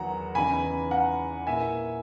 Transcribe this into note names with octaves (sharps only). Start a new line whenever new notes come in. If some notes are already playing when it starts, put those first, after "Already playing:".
Already playing: E2 D#3 F#3 F#5 A#5
E2 C#3 E3 B3 D#4 G#5 B5
F#5 A#5
A#2 A#3 E4 E5 G#5